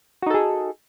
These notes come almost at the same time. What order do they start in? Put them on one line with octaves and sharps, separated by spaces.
F#4 D#4 A4 G#4